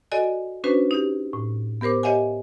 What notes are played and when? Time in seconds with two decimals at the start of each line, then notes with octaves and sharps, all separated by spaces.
0.12 F#4 A4 D5 D#5 G#5
0.64 C#4 D4 F#4 B4 C5
0.91 D#4 G4
1.33 A2
1.81 B3 G4 A#4 C5 D6
2.03 G4 C#5 D#5 E5 F#5 G#5